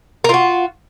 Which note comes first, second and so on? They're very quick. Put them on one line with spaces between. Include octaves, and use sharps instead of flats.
A#4 F4 F#4